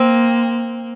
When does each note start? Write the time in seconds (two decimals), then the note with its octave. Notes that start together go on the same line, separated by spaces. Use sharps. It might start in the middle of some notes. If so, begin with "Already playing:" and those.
Already playing: A#3 C4